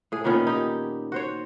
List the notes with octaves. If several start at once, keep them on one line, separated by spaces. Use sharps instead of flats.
A2 G#4
A#2 D#3 B3 C#4
D#4 G4
F#4 C5 C#5